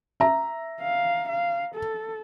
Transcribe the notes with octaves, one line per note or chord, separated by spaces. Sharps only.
E5 A#5
F5
F5
A4